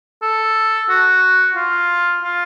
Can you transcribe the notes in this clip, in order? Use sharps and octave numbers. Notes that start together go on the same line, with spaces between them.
A4
F#4
F4
F4